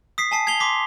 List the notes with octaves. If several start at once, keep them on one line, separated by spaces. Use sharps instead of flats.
D#6 B6 C7
G#5 A5 C7
G#6 C7 F7 G7
C6 D6 B6